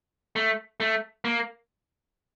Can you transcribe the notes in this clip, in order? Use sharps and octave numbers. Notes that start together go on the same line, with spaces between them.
A3
A3
A#3